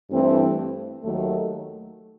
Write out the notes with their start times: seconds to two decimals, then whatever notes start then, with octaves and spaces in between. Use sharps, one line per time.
0.11 G2 E3 A3 C4
1.03 D#2 D#3 F#3 A3